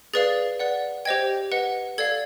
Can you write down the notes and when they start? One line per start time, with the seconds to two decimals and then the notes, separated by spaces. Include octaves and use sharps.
0.14 G#4 B4 D5 F5 A6
0.60 B4 D5 F#5
1.05 G4 C5 D#5 G5 G#6
1.52 B4 D#5 F#5
1.98 A4 D5 F5 G#6